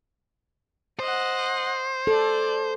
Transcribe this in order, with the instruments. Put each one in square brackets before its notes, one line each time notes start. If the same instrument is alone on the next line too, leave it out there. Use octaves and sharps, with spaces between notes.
[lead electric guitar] C5 [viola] D#5 F#5
[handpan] A4 [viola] D5